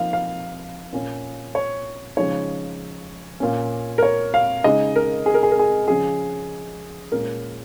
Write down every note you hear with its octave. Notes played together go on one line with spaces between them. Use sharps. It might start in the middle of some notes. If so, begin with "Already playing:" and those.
Already playing: F3 A#3 D#4 F5
F5
A#2 A#3 C#4
C#5
C#3 F3 G#3 D#4 C#5
A#2 A#3 C#4
A#4
C#5
F5
C#3 G#3 D#4 D#5
A#4
G#4
A#4
G#4
A#4
G#4
C#3 F3 C#4 G#4
A#2 G#3 C#4 A#4